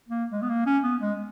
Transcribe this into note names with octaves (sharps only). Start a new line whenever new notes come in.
A#3
G#3
B3
A#3
C#4
B3
G#3